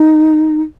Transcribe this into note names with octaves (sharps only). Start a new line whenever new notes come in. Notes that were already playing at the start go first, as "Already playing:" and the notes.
Already playing: D#4